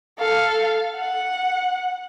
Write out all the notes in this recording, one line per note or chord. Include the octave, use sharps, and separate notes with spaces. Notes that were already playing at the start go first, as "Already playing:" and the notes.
A4 F5
F#5